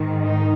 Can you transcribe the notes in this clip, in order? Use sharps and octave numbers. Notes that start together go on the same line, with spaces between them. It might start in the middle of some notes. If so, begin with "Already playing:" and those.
Already playing: G#2 D#3
D#4